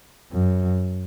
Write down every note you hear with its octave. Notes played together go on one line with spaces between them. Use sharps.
F#2